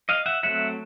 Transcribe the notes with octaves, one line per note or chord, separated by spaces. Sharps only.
D#5 F5
E5 F#5
F#3 A3 C4 E5 F#5